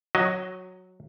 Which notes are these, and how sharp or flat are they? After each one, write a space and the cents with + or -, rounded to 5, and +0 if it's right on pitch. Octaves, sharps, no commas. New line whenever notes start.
F#3 -5 F#4 +30 D#5 +0